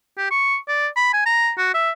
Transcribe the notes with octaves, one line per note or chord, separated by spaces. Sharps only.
G4
C#6
D5
B5
G#5
A#5
F#4
E5